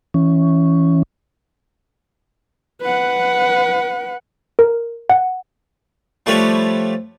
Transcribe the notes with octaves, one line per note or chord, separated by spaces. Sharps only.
E3 C#4
B4 F#5
A#4
F#5
F3 G3 A3 G4 B4 C#5